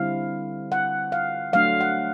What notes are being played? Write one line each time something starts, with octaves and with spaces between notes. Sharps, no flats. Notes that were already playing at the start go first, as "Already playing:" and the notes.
Already playing: D3 G3 C4 E4 F5
F#5
F5
F#3 A3 D4 F5
F#5